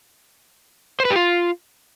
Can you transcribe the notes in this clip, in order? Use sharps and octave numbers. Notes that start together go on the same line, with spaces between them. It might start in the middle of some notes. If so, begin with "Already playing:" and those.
C5
B4
G4
F4